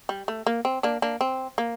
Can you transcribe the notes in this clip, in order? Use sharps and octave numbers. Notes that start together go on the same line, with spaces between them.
G3
A3
A#3
C4
A#3 D4
A#3 D4
C4
A#3